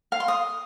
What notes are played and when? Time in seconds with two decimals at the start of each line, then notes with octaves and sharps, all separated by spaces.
0.12 F5
0.20 C6
0.28 D#6